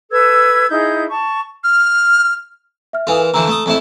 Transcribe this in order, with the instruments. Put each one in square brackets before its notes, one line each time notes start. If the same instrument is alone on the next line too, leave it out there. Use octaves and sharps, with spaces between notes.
[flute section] A4 B4 E6 G#6
D#4 E4 G#4 G6
A5 C#6
[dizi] F6
[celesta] E5 F6
[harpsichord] E3 F4 [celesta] A4 G#5 D#6
[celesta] A#4
[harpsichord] D3 E3 F3 [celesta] A#5 E6
[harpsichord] A3 D#6
F2 A3 E4